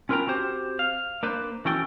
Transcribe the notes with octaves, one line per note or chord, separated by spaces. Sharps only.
C#4 F4 A#4 B4 G5 A#5
C4 F#4 G4 C5
F5
A#3 D4 B4 C5
E3 C#4 F#4 A4 G5